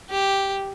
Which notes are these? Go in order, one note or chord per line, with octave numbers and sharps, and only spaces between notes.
G4